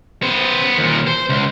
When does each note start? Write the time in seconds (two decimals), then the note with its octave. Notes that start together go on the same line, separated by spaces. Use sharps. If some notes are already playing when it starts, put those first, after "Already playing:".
0.23 B3 C5
0.78 D#2 A#2
1.07 C5
1.29 C#2